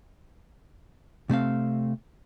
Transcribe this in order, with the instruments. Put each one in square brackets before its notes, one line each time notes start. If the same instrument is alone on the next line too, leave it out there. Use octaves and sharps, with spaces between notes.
[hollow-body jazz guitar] C3 A3 C4 F5